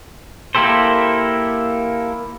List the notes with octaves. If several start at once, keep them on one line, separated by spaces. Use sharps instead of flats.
A#3 E4 G4 A4 C5